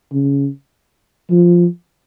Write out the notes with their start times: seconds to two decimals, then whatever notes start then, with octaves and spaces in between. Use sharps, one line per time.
0.12 C#3
1.30 F3